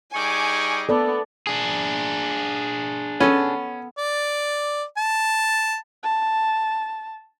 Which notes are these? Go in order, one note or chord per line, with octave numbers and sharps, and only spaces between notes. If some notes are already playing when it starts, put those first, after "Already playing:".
G3 D#4 G#4 G#5 C#6 D6
B3 A4 D5
D4 G#4
B3 C#4 A4
D5
A5
A5